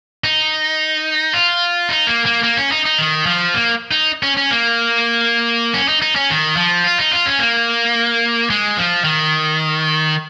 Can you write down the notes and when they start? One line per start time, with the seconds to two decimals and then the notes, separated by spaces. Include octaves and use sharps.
0.24 D#4
1.34 F4
1.89 D#4
2.07 A#3
2.26 A#3
2.43 A#3
2.57 C#4
2.72 D#4
2.85 D#4
2.98 D#3
3.26 F3
3.54 A#3
3.91 D#4
4.23 C#4
4.37 C#4
4.51 A#3
5.74 C#4
5.88 D#4
6.02 D#4
6.16 C#4
6.30 D#3
6.57 F3
6.84 F4
6.98 D#4
7.12 F4
7.26 C#4
7.39 A#3
8.50 G#3
8.77 F3
9.05 D#3